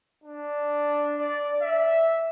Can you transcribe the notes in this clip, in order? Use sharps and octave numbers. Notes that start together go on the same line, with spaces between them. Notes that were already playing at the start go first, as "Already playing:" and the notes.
D4
D5
E5